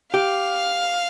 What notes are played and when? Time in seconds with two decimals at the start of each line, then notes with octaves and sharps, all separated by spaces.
0.13 G4 F5